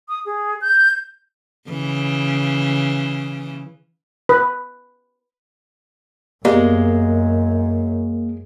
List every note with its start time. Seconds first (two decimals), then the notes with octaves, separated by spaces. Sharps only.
0.09 D#6
0.26 G#4
0.61 G6
1.69 C#3 E3
4.29 B4
6.45 F#2 G#3 A#3 B3 G4 D5